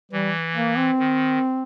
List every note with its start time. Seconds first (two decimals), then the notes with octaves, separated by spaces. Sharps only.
0.12 E3 G3
0.55 A#3
0.77 C4
0.99 D#3